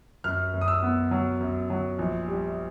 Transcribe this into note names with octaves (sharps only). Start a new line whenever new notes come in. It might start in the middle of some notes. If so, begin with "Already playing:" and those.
F#2 F6
F#2
D#6
E6
B3
F#3
F#2
F#3
A#1
G3